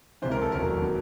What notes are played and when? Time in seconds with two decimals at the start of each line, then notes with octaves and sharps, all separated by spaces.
0.22 C#2 C3 E3 C5
0.32 A#4
0.42 A4
0.52 E1 D#2 D#3 F#3 A#4
0.82 B2 F#3